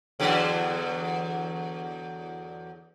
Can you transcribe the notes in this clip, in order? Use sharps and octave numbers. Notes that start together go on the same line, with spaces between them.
E2 D3 F#3